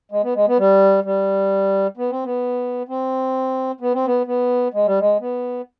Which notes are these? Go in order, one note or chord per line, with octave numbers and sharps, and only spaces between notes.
G#3
B3
G#3
B3
G3
G3
B3
C4
B3
C4
B3
C4
B3
B3
G#3
G3
G#3
B3